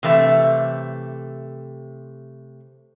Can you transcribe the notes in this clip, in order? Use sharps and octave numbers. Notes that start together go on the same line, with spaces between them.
C3 E3 A3 E5